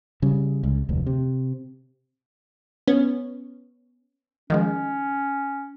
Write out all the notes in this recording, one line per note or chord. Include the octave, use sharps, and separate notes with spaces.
C#3 G3
C#2
F1 D2
C3
B3 C#4
D#3 F3 G#3 C#4